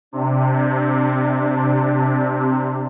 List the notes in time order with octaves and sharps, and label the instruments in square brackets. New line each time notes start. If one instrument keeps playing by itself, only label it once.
[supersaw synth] C3 [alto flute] D4